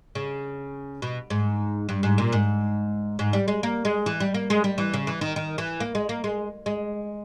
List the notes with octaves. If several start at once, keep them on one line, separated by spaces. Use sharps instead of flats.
C#3
B2
G#2
G2
G#2
A#2
G#2
G#2
G3
G#3
A#3
G#3
E3
G3
A#3
G#3
G3
E3
C#3
E3
D#3
D#3
E3
A#3
G#3
A#3
G#3
G#3